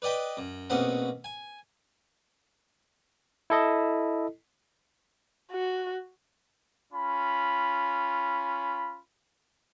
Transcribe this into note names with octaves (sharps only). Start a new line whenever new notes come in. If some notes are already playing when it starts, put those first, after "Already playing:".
B4 D5 D#5 G5 B5
F#2
A#1 B2 C4 C#4 F#5 B5
G#5
E4 A4 D#5
F#4
C#4 F4 B5